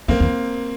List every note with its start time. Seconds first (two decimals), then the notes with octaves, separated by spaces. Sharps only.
0.08 F2 A#3 C4
0.20 E2